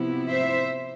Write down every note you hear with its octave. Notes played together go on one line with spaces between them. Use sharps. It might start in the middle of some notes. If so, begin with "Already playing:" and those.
Already playing: C3 F3 B3 E4
C5 E5